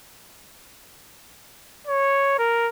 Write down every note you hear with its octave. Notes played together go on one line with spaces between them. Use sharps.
C#5
A#4